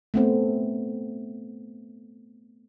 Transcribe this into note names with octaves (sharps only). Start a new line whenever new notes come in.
A3 B3 C4